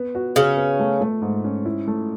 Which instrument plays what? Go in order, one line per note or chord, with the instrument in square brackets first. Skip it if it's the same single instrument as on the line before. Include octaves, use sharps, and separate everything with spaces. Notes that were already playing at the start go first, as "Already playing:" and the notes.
Already playing: [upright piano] B3
F#4
[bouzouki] C#3 C#4 [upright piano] F#4
[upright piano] B3
A3
A3
G#2
C#4
E4
A3